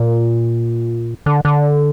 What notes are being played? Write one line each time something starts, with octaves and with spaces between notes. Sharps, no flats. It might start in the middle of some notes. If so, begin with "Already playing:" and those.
Already playing: A#2
D3
D3